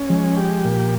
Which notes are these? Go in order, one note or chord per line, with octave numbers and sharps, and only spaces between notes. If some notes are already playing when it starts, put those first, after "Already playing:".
Already playing: C#4
F3 G#3
G4
A#2